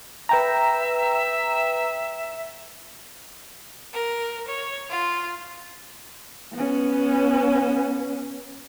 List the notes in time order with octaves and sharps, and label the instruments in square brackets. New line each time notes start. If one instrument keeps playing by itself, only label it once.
[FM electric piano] B4 G5 A#5 [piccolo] E5
[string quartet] A#4
C#5
F4
[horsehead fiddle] B3 C#4